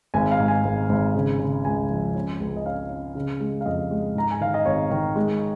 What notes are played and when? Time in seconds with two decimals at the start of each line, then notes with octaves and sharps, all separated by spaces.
0.14 G#1 G#5
0.31 F5
0.39 G#2
0.48 G#5
0.64 G#1
0.89 G#1
1.14 C#3
1.39 C#3
1.65 C#2 G#5
1.90 F3
2.15 C#4
2.40 C#2
2.56 D#5
2.66 C#4 F5
2.90 C#4
3.15 C#3
3.40 G#3
3.61 F5
3.66 F2 D#5
3.91 G#3
4.15 G#2 A#5
4.31 G#5
4.41 D#3 F5
4.54 D#5
4.66 G#1 C#5
4.91 D#3
5.16 G#3